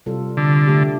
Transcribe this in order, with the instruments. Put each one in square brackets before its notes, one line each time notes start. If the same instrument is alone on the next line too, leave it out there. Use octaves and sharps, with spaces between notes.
[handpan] C3 G3 F4 A4
[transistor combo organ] D3
[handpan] A3 D4 G4